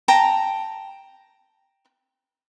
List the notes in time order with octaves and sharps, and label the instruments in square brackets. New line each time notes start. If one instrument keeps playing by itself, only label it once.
[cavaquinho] G5 A5 A#5